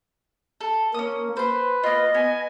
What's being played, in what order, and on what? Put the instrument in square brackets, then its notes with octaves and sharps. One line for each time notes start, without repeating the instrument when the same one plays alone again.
[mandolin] A4
[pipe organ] A#3 [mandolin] C#4 D#6
[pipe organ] B4 [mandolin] C5 C6
[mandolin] A#3 F4 [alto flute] D#5
[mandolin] B3 [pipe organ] G#5